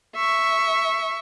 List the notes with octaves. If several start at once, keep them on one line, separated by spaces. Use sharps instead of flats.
E5 C#6